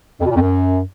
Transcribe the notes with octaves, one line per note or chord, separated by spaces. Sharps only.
F2
B2
A#2
F2
F#2